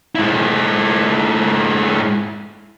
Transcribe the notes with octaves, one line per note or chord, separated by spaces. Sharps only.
G#2 E4